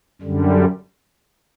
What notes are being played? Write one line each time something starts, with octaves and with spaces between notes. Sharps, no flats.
F#2 D3 G3